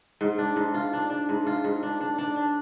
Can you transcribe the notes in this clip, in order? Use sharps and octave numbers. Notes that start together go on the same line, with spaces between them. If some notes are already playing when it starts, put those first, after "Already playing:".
G#2
D4
G#2
F4
D4
D4
G#2
F4
G#2
D4
D4
D4
D4